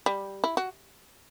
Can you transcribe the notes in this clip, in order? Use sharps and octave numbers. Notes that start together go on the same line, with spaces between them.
G3
E4
F#4